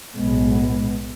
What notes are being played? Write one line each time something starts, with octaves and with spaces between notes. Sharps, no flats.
B1 A2 G#3 B3